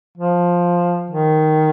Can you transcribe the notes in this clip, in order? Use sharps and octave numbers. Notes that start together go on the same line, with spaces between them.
F3
D#3